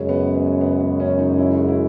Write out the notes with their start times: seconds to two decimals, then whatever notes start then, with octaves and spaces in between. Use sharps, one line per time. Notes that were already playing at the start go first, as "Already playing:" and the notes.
Already playing: F#2 C#3 G#3 C#4
0.09 B3
0.35 B3
0.61 B3
0.80 B3
1.00 C#4
1.19 D#4
1.38 E4
1.59 F#4
1.68 E4